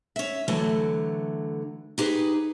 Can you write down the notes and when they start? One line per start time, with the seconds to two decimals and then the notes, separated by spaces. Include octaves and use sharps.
0.16 C#4 E5
0.48 D3 E3 F#3 A3
1.98 D#4 G4 G#4 B4